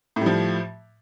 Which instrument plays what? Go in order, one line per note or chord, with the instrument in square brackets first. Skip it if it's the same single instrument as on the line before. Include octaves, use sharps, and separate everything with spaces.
[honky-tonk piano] A2
G3
F3